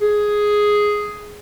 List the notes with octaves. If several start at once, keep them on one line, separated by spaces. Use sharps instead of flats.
G#4